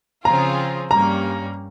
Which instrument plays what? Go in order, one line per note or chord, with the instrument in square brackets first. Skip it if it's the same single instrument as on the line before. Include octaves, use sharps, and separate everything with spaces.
[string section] C#3 F3 C4 F4 G#4 [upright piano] A#5
[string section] G2 G3 A#3 C#4 [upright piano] A#5